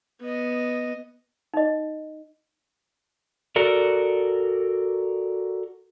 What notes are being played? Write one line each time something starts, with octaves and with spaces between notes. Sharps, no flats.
B3 D#5
D#4 D#5
F#4 A4 A#4 D5